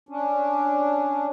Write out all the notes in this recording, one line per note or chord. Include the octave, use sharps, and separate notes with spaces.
C#4 D4